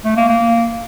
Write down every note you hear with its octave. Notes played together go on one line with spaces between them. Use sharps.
A3
A#3
A#3